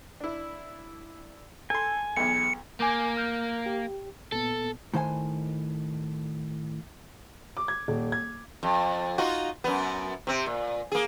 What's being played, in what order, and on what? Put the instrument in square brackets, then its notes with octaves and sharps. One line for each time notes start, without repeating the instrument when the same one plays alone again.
[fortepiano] D4 E4
[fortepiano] A4 C6 [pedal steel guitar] G#5
[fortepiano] B1 E2 [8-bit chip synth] C#7
[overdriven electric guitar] A#3 [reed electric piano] G#5 D6 G6
[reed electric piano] F6 G6
G4
[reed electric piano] A#2 B3 [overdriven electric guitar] A4
[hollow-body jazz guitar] A2 D#3 C5 F5 G#5
[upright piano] D6
G#6
D#1
G#6
[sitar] F2
D#4 F4 F#4
F#2 B3
C3 C4
A#2
A#3 G#4